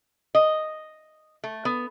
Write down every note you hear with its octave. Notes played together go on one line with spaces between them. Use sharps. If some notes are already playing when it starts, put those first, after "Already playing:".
D#5
A3
B3